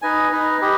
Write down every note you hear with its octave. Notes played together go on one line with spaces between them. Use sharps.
D#4 B4 D#5 G#5
D#4 B4 D#5
G4 B4 D#5